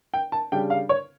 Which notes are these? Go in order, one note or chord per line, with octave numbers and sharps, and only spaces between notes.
G5
A5
C#3 G3 D4 G5
F5
C#5